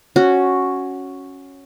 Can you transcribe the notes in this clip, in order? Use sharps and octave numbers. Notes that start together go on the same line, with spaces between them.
C#4 F#4